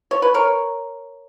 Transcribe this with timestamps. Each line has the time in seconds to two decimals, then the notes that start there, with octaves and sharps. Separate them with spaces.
0.11 C#5
0.22 B4
0.34 A#4 C#5